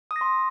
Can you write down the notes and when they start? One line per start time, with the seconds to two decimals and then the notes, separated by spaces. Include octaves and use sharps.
0.11 D#6
0.16 A#6
0.21 C6